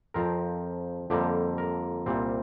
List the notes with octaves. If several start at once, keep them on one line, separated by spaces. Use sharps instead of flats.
F2 F3 C4 A#4
F2 D3 G3 A#3 G4
A#4
C2 A#2 G3 C4